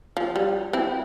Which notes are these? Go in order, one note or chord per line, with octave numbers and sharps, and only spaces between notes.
F3
G3
C4 E4